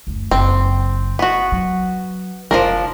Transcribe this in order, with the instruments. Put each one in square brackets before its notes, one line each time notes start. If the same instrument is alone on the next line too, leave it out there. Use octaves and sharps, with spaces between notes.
[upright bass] F#1 D2
[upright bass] F#1 [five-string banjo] C4
[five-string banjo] B3 F#4
[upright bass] F#3
[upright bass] F1 [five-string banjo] F3 D4 A#4